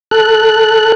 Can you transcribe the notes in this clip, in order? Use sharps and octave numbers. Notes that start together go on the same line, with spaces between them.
A4 F#6